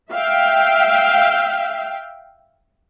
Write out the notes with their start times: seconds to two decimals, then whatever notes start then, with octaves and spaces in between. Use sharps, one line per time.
0.12 E5 F5 G5